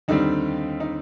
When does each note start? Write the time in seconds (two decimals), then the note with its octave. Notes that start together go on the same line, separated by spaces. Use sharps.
0.08 D#2 D3 G3 C4 D#4
0.80 D#4